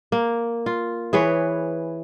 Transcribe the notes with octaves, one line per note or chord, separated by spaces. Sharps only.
A#3
F4
E3 G#4 B4 C#5